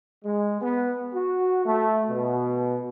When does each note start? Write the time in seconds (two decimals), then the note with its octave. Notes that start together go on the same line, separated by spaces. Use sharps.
0.24 G#3
0.60 B3
1.12 F#4
1.64 A3
2.09 B2